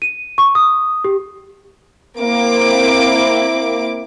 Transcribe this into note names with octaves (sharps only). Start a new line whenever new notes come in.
D#7
C#6
D#6
G4
A#3 C4 E4 D6